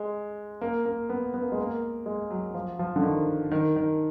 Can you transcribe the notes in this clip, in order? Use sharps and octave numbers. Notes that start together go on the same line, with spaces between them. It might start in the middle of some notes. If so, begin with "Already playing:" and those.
Already playing: G#3
A#3
A#3
B3
B3
A#3
G#3
A#3
G#3
F#3
F3
F3
D3
D#3
D#3
D#3